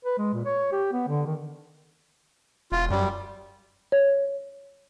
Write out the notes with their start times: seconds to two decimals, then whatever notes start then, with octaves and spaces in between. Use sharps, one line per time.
0.05 B4
0.18 G#3
0.33 A#2
0.45 C#5
0.72 G4
0.92 B3
1.08 D3
1.26 D#3
2.72 E1 F4
2.90 F#2 G3
3.92 C#5